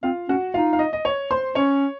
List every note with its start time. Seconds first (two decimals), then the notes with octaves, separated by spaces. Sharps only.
0.03 C4 F4 F5
0.29 C#4 F#4 F#5
0.54 D#4 F4 F5
0.73 F5
0.79 D#5
0.93 D#5
1.05 C#5
1.31 C5 C6
1.55 C#4 C#5 C#6